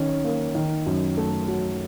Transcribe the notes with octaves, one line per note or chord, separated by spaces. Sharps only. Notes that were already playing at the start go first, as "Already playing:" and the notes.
Already playing: D#3 C#4
A#3
D#3
F#2
A3
F#3